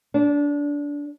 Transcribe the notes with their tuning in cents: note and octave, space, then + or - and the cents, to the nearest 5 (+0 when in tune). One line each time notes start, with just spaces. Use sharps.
D4 -20